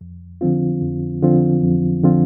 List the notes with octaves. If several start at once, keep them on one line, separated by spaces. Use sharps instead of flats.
F2
D3 F3 C4 F4
F2
D3 F3 C4 F4
F2
D3 F3 C4 F4